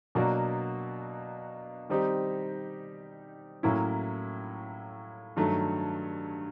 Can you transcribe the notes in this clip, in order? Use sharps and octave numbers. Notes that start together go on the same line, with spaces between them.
B2 F#3 A#3 D4 F#4
D#3 G3 C4 D#4 G4
A2 F#3 A#3 C#4 E4
G2 D#3 F#3 A3